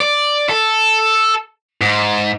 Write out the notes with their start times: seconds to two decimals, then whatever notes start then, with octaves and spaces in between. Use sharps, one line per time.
0.01 D5
0.49 A4
1.81 G#2